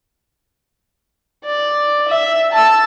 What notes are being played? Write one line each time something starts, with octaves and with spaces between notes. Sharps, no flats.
D5
E5
A5 E6